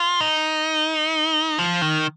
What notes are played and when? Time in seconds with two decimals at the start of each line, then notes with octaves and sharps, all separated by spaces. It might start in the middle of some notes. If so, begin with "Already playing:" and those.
Already playing: F4
0.21 D#4
1.59 F3
1.82 D#3